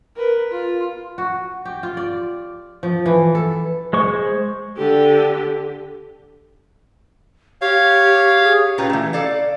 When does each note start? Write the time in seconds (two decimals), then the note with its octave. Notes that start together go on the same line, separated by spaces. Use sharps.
0.15 A#4 B4
0.51 F4
1.18 F#4
1.65 G4
1.83 F4
1.97 D5
2.83 F3
3.06 E3
3.35 A4
3.93 G#3 C5 C#6
4.77 D3 G4
7.62 G4 C#5 F5
8.44 G#4
8.78 A#2 C#4 F4 G4 B4 A#5
8.90 E3 A3
9.13 A4 D5 F5